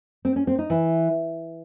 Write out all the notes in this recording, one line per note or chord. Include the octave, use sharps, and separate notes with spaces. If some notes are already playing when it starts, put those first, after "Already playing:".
C4
C#4
C4
D#4
E3